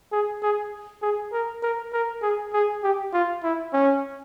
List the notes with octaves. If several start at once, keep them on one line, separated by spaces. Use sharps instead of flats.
G#4
G#4
G#4
A#4
A#4
A#4
G#4
G#4
G4
F4
E4
C#4